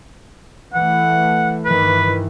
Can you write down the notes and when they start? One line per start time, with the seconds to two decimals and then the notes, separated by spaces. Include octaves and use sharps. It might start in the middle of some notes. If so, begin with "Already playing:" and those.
0.74 E3 A3 F#5
1.65 G2 D#3 E3 B4